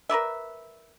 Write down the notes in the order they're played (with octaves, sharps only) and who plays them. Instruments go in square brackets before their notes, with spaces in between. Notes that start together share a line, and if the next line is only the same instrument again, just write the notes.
[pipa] A#4 B4 D5 E5